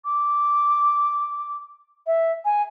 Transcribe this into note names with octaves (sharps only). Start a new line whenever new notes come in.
D6
E5
G#5